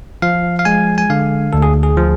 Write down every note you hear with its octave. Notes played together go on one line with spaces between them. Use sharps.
F3 F5
F5
G#3 G#5
G#5
D3 F5
D2 A4
G#4
G#4
F3